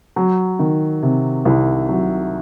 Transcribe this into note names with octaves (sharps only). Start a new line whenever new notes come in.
F#3
D#3
C3
C2
F#3